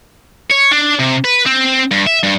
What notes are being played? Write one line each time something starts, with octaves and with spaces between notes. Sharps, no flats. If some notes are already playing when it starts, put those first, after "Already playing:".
C#5
D4
C3
B4
C4
G2
E5
G2